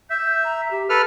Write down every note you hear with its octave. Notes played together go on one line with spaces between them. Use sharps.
E5 G6
A#5
G4
A4 B4 F6